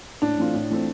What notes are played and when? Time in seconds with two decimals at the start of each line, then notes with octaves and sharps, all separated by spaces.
0.22 A2 D4
0.38 E3 A3 C4 F4
0.54 A2
0.70 E3 A3 C4 F4